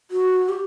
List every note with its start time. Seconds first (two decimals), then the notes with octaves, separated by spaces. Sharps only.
0.11 F#4
0.49 G4